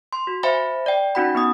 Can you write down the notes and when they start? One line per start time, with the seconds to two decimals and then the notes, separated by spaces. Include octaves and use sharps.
0.13 C6
0.27 F#4
0.43 C5 E5 F5 G#5 B5
0.86 D5 G5
1.15 C#4 D#4 F#4 F#5 B5
1.35 B3 D#4 D#6